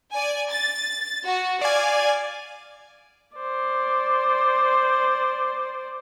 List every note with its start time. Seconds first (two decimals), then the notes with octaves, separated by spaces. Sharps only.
0.12 D5 G#5
0.51 A6
1.24 F#4
1.61 D5 F5 G#5
3.36 C5 D5